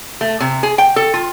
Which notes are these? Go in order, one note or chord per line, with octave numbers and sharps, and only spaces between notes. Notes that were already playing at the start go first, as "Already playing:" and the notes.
A3
C3
G#4
G5
A4
F4